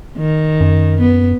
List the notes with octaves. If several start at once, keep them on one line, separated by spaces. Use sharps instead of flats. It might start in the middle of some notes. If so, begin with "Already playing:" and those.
D#3
F#2
B3